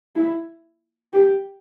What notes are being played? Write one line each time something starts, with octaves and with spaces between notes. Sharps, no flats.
E4
G4